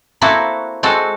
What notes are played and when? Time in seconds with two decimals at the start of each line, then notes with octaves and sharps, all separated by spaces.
0.21 A#3 C4 E4 F#4 A4
0.83 G#3 C4 F#4 A4